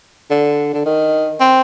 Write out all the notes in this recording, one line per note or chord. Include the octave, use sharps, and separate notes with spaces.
D3
D3
D#3
C4